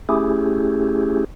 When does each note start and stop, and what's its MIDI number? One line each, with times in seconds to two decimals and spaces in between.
0.09 1.24 57
0.09 1.24 61
0.09 1.24 64
0.09 1.24 67
0.09 1.24 68